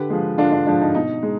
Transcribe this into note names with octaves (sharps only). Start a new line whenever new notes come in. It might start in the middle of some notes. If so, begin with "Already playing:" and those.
Already playing: D3 G4 B4
F3 G#3
D3 D4 F4
D4
F3 G#3 D4
D#4
B2 D#4
G#3